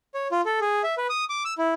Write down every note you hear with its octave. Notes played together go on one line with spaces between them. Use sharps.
C#5
F4
A4
G#4
E5
B4
D#6
D6
E6
E4